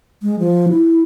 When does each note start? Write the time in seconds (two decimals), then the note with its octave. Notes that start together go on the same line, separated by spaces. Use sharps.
0.22 G#3
0.39 F3
0.69 E4